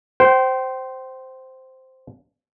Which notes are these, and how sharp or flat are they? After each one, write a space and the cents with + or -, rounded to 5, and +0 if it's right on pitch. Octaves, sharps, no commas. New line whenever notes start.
C5 -5 G5 -30